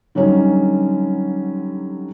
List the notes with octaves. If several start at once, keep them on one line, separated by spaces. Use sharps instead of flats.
D3 F#3 G3 C#4 D#4